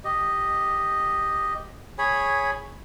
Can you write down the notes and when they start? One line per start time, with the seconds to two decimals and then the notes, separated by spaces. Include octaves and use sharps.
0.04 G4 D#5
1.98 G#4 C#5 G#5 B5